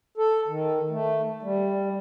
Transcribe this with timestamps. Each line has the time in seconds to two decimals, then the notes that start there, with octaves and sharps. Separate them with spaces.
0.18 A4
0.48 D#3
0.90 A3
1.43 G3